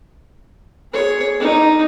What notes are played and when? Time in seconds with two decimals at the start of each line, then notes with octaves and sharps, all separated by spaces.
0.93 G#4 C#5
1.40 D#4